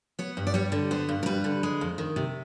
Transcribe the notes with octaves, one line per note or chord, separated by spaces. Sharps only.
B3 C#5
G2
D5
G3 C#5
D3
B3 C5
G2
A#4
G3 B4
D3
G#3
F2
D#3
C3